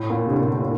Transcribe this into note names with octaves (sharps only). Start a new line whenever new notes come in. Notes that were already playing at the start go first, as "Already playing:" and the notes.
Already playing: A2
A#2
C3
D3
A#2
A2
A#2